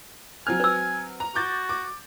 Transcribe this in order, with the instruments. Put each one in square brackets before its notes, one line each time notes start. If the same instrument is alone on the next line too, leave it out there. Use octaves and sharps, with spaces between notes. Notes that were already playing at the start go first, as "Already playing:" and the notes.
[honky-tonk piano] F#3 C4 F6 [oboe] G#5
[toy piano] B4 E6
[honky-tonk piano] A#5
[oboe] F#4 [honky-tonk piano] D6 G6 A6
[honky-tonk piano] D6